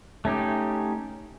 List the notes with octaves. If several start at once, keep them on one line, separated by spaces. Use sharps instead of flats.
A3 C#4 D#4 G4